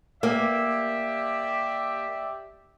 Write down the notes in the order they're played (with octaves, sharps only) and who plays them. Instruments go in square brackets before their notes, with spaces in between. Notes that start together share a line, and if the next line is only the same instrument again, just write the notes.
[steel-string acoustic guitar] A#3 [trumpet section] G4 D5 E5